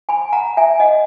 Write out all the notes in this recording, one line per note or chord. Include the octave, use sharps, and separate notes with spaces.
G#5 B5
F#5 A#5
E5 G#5
D#5 F#5